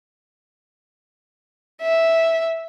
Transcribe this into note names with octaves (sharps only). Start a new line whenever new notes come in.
E5